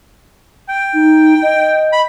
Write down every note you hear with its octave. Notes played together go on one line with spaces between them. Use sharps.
G5
D#4
D#5
B5